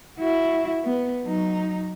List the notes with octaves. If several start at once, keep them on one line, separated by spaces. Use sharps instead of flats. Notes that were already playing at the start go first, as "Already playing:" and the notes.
E4 F#4
B3
F#3 D#4